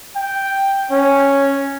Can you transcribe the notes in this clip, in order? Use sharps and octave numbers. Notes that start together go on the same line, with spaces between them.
G5
C#4